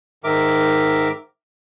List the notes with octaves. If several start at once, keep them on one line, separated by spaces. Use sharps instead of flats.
G#2 D#3 A#4 E5 D6